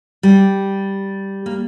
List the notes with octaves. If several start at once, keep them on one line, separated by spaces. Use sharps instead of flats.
G3
A#3